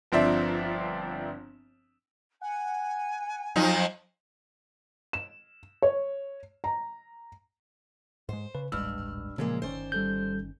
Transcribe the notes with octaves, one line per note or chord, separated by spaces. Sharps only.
G1 F3 C4 D4 E5
F#5 G#5
F2 F3 F#3 D#4
E7
C#5
A#5
G#2 G#3 C5
C#3 B4
D#1 A1 G2 G#3 E6 F6
A#2 C#3 F3 F#3 G#3 A#3
G1 D#3 C#4 C5 D5
G3 A4 G6